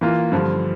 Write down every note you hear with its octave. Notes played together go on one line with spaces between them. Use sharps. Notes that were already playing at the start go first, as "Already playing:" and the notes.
E3 A#3 F4
G2 D3 F3